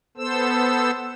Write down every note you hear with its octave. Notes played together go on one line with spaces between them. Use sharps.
B3 A4 C5 E6